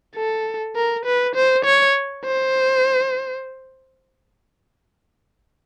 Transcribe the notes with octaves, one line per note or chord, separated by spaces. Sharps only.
A4
A#4
B4
C5
C#5
C5